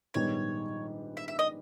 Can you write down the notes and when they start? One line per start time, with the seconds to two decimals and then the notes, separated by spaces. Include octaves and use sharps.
0.14 A#1 G#2 D#3 G3 B3 C#5
1.17 E5
1.28 E5
1.39 D#5